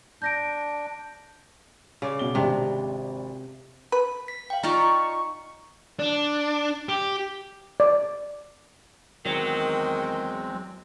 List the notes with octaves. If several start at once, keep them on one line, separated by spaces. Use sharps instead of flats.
D4 G6 A#6 D7
C#3 D5
B2 G7
G#1 C3 D4
B4
B6
F5 G5
D#4 F4 D5 A#5 C#6 F6
D4
G4
D5
E2 D#3 F#3 G#3 C4